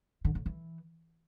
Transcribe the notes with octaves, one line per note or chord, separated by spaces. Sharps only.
D3
C#3
E3